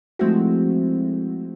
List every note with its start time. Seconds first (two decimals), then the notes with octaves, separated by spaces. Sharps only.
0.19 F3 G#3 A3 C4 E4 F#4